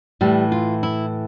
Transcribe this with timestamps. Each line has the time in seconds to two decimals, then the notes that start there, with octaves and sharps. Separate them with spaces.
0.21 A2 E3 G3
0.52 F4
0.83 E4